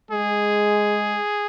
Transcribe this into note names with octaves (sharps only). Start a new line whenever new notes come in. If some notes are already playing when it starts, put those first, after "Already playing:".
G#3 G#4